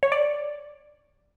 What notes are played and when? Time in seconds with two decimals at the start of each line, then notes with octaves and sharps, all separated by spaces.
0.03 C#5
0.12 D5